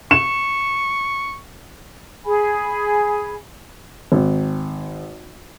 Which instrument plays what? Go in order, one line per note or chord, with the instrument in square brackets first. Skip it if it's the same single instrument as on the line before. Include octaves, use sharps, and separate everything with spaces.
[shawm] C#6 [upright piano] E7
[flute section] G#4 G#5 B5
[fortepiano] G#1